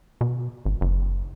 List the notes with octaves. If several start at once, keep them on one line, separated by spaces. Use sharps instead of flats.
B2
G#1
F#1